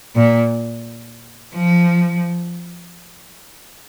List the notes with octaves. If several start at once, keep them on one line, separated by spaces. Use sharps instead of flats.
A#2
F3